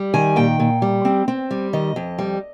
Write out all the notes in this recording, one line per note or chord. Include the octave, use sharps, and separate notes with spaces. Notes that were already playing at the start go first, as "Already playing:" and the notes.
Already playing: G3
D#3 G#5
A#2 G5
A#2
G3
C4
C4
G3
D#3 D#5
F2
G3